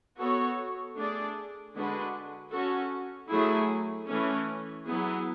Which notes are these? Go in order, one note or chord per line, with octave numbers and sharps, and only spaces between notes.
B3 F#4 A4 C#5
A3 D4 G#4 D5
D3 G#3 D4 F#4 B4
C#4 F#4 A4
F#3 A3 E4 G#4
E3 A3 C#4
F#3 B3 E4 G#4